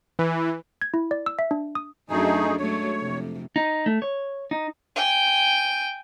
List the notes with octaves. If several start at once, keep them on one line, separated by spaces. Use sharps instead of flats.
E3
G#6
E4
D5
E6
E5
D4
D#6
F#2 F#3 A3 D4 D#4 G#4
F#3 G#3 A3 C#5
F2 C3
D#4
A3
C#5
D#4
G5 G#5